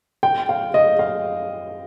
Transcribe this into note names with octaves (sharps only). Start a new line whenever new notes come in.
G5
F5
D#5
F5